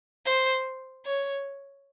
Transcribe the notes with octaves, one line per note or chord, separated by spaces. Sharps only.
C5
C#5